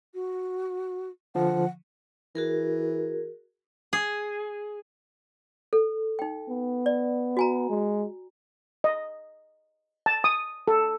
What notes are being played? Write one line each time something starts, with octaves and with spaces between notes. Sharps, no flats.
F#4
D3 F3 F#5
E3 F#4 G#4 A#4
G#4
A4
D#4 G5
B3
D5
F#4 G#5 A#5
G#3
D#5
A5
D#6
A4